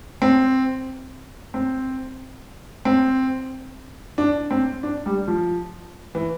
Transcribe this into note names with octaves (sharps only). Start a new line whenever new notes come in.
C4
C4
C4
D4
C4
D4
G3
F3
E3